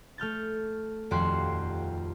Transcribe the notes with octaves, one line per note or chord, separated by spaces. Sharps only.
A3 F6 G6 A6
D#1 F2 F#4 G4 C6 F#6